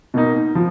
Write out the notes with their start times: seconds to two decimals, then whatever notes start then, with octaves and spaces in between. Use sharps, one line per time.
0.14 B2 A#3 D#4
0.55 F3